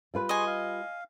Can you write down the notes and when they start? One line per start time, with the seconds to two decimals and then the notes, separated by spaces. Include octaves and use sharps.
0.14 G3 F4 B4
0.29 G#4 D#5 G#5 C6 C#6
0.47 F5